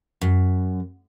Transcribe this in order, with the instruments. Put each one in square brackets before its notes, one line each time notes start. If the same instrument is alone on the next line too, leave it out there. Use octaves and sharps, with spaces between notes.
[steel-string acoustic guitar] F#2